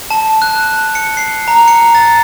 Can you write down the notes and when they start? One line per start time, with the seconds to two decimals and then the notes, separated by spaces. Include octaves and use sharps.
0.10 A5
0.42 F#6
0.95 C#7
1.17 C7
1.48 A#5
1.68 C#7
1.95 A6